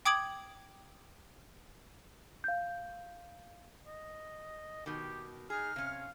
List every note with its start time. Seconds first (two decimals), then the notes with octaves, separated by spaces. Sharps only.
0.05 G5 D6 D#6 G#6 D7 F#7
2.44 F5 G6
3.87 D#5
4.86 B2 D#3 G4
5.50 D#4 G#4 F6
5.76 C3 C#4 F5